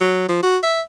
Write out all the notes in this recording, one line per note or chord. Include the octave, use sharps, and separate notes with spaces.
F#3
F3
F#4
E5